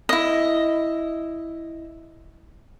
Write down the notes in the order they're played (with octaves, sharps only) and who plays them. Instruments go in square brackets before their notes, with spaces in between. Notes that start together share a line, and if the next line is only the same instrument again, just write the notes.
[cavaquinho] E4 D#5